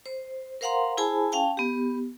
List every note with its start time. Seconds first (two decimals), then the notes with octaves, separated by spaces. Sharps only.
0.06 C5
0.61 A#4 C5 F5 F#5 A#5 C6
0.97 E4 G#4 C5 G#5 A5 B5
1.32 C#4 F5 G5 A5
1.57 B3 G4